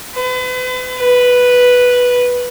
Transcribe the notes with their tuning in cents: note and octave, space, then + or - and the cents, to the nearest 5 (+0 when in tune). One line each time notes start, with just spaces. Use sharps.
B4 +40
B4 -5